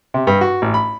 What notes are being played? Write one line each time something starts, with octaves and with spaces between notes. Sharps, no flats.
C3
G2
F#4
A1
B5